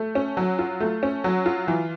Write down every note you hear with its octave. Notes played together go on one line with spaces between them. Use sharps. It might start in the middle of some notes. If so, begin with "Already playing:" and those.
Already playing: A3
C#4
F#3
F4
A3
C#4
F#3
F4
E3